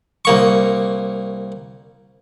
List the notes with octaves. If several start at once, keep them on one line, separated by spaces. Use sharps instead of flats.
C2 A#3 C#6